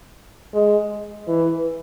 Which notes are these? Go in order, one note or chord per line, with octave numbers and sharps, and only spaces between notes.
G#3
E3